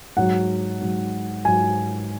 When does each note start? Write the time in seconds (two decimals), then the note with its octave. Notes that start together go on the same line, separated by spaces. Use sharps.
0.17 G#2 F#3 F#5
0.81 G#2 F#3
1.45 G#2 F#3 G#5